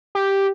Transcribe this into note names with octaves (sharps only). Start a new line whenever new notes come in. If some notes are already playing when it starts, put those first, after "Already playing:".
G4